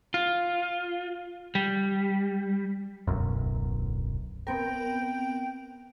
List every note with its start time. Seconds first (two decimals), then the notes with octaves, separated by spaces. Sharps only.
0.14 F4
1.55 G3
3.07 D1 B1 F#2
4.47 B3 C4 A#4 G5